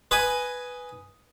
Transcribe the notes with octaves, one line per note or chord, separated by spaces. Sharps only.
B4 D#5 G#5 B5